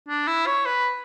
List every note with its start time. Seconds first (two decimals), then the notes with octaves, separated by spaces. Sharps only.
0.08 D4
0.28 E4
0.47 C#5
0.66 B4